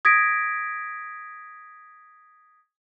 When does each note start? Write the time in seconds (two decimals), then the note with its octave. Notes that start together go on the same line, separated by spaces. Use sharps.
0.05 D#6 G#6 A#6 B6 D7